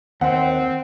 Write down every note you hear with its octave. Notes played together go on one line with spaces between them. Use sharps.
D#2 C4 F#5